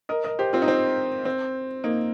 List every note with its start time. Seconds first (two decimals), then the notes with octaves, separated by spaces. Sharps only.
0.09 A#4 D#5
0.24 A#4 D#5
0.39 G4 C5
0.53 C4 F4
0.62 D#4
0.68 C4
1.25 C4
1.84 A#3 D#4